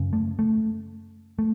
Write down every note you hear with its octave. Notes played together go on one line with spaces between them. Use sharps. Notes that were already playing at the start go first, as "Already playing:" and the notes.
Already playing: F#2 C#3
A3
A3
A3